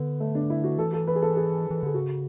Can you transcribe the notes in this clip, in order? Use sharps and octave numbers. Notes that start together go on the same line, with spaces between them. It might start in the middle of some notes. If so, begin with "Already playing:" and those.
Already playing: D3 B3
A3
D4
E4
F#4
E3 A4
A4
B4
G#4
A4
G#4
E3
D3 G#4
C#3 F#4